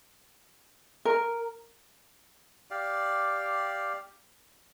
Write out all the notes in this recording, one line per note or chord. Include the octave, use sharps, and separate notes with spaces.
A#4
G4 D5 F5